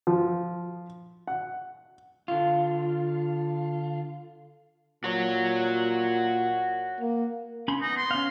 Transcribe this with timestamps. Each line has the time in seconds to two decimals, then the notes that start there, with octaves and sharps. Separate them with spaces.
0.07 F3
1.27 F#5
2.28 D3 F4
5.04 A#2 F#4 C#5
7.00 A#3
7.68 C#4 B5 C6
7.81 B3 D#4
7.97 C6
8.11 C#4 F5